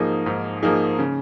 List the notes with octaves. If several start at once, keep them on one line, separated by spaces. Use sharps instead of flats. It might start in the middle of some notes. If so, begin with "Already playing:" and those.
Already playing: G#2 F3 A#3 D#4 G#4
G#2
F3 A#3 D#4 G#4
C#3